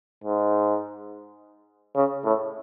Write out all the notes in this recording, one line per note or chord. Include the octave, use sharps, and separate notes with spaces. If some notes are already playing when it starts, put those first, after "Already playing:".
G#2
C#3
A2